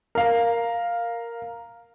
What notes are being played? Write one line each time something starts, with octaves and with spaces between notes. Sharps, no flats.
A#4 F5